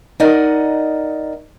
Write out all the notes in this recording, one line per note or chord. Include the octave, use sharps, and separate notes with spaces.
D#4 A#4 D5 D#5 F#5